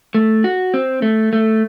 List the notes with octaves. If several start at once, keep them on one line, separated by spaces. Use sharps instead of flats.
A3
F#4
C4
A3
A3